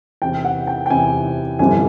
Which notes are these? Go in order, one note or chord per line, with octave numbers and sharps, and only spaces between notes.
E2 C3 E3 G5
F#5
G5
G5
E2 C3 E3 G#5
G1 F2 C3 E3 G3 G#5